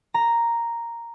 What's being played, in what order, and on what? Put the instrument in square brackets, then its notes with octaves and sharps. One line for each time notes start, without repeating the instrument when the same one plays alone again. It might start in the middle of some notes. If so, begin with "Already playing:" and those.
[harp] A#5